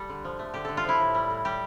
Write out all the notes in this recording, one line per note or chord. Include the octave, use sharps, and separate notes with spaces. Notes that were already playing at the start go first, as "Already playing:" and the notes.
Already playing: G3 G4 A4
D3
F3
A3
D3 G4
D3 A4
F4
F3 E4
A2
G3
A2
G3 G4